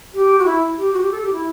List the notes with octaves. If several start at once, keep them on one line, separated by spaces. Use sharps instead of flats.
G4
F#4
E4
G4
F#4
G4
A4
G4
E4